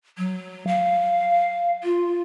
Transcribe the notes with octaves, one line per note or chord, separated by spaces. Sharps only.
F#3
F5
F4